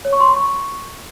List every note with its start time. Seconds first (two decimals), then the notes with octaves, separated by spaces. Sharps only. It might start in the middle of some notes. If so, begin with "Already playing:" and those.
0.05 C#5
0.13 C#6
0.20 C6
0.28 B5
0.36 C#6